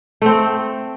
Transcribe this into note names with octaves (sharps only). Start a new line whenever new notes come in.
A3 C4